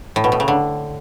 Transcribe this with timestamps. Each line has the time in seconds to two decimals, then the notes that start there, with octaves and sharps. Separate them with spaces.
0.16 A2
0.24 B2
0.32 A2
0.40 C#3
0.48 D3